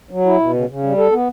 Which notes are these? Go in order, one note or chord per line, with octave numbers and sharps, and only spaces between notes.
F#3
E4
B2
C#3
C#3
G3
A4
B3